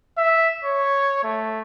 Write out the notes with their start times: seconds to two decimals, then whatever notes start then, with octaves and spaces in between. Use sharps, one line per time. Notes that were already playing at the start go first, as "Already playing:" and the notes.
0.18 E5
0.65 C#5
1.23 A3